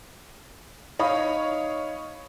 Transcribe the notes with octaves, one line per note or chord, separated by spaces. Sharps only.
D#4 C#5 F5 B5 D#6